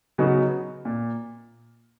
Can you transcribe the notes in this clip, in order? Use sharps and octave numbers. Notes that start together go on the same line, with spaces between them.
C#3 F#3 B3 D#4 F#4
A#2